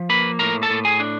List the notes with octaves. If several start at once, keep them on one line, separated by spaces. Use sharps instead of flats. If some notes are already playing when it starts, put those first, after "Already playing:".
Already playing: F3
A#3 B4 B5
A2 A#4 A#5
A4 A5
A2
G#4 G#5
D4